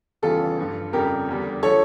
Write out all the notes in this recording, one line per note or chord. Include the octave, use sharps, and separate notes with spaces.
E2 C#3 E3 G3 F4 A4
G2 F3
F2 C#3 G3 G4 A#4
E2 D3 G3
D3 F3 A4 C#5